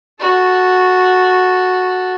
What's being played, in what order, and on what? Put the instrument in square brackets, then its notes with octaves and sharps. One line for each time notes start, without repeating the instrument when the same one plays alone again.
[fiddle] F#4 A4